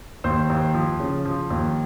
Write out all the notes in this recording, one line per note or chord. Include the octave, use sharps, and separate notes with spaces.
D#2 C5
D#2
F3
C#3
F3
D#2